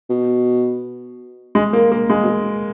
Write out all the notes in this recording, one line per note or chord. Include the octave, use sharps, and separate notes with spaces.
B2
G#3
A#3
A#3
G#3
B2